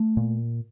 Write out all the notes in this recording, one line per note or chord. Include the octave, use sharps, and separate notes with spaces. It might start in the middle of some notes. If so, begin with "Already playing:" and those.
Already playing: A3
A#2